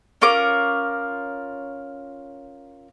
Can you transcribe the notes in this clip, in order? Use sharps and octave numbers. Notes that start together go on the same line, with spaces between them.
C#4 F4 A#4 D6